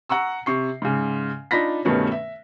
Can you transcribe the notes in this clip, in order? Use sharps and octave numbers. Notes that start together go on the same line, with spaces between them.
F#5 A#5 C#6 E6
C3 C#6 C7
G#2 C#3
D4 D#4 F4 B5 A#6 B6
G2 B2 D#3 A3 C#4
E5